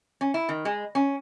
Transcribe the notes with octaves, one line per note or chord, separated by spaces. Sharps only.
C#4
E4
D#3
G#3
C#4